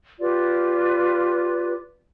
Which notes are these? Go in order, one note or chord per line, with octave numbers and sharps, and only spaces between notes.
F4 G4 B4 D5